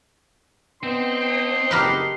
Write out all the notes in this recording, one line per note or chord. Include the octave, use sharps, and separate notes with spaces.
B3 C4 D4 D#4 C6
F#1 G4 A#4 B4